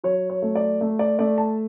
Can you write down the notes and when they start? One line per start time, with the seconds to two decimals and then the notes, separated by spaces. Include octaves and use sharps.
0.04 F#3 C#5
0.30 C#5
0.42 A3
0.55 D5
0.81 A3
0.99 D5
1.19 A3 D5
1.38 A5